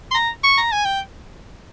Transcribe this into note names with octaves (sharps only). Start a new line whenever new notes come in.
C6
A#5
C#6
A#5
G#5
G5